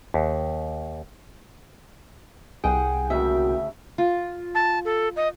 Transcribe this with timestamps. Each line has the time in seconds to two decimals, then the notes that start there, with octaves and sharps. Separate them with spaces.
0.14 D#2
2.64 C2 G#4 F#5 G5
3.10 D2 C#3 A#3 C#4 F#4 E5
3.98 F4
4.55 A5
4.85 A4
5.16 D#5